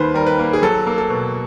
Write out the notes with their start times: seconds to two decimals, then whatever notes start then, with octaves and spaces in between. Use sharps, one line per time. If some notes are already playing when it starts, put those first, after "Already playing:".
Already playing: D#2 D#3 G3 A#3 B4 C5
0.14 G3 A#4
0.26 B4
0.39 A#3
0.53 G#4
0.62 F#3 A4
0.87 A#3
0.98 A4
1.10 B2